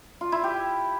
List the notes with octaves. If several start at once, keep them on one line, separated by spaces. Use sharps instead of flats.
F4
E4
G4